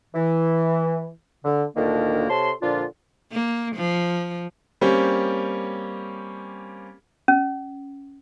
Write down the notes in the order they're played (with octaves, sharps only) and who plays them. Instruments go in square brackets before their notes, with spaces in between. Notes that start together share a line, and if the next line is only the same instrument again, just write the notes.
[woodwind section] E3
D3
D2 A#2 D3 D#3 A#3 D4
C3 A4 C#5 A5 C6
A#2 D3 F3 D4 F4
[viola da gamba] A#3
F3
[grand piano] G3 A#3 C4 C#4 G4
[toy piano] C#4